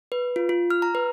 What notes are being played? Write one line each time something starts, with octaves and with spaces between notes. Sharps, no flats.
B4
F4
F4
F6
A#5
B4